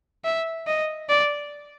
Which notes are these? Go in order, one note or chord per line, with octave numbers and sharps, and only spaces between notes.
E5
D#5
D5